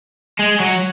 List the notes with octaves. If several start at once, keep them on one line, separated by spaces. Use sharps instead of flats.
G#3
F#3